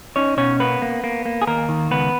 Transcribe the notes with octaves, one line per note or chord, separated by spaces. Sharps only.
C#4 D#4 C#5
B2 C#4 C#5
A#3 B3 B4
A#3
A#3
A#3
G#4
D#2 A#3 A#4
D#3
C#2 B3 B4